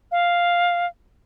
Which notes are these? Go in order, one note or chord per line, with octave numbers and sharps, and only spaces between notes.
F5